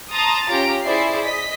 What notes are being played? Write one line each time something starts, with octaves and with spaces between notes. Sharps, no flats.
A5 A#5 C6 D#6 A6 A#6
C#4 F4 G4 A#5 D7
E4 G#4 C5 D5 E5 C7
D#5 B6